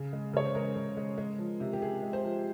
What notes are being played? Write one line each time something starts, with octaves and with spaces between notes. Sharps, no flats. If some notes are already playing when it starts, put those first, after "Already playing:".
Already playing: C#3
G#3
C#3 C#5
C5
G#3 A#4
C#3
G#3
G#3
F3
C3
G4
C3 G#4
G#3
C5
F3